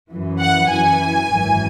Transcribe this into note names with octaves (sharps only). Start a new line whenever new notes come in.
F#2 E3
F#5
F#2 E3 G#5
G#1 F#2 E3